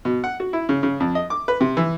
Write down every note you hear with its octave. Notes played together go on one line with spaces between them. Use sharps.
B2
F#5
F#4
E4
C#3
C#3
F2
D#5
D6
B4
C3
E3